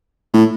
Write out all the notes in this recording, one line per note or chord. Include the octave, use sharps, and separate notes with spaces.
A2